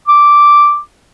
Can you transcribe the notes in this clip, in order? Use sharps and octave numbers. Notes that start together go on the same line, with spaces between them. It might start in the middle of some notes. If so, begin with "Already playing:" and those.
D6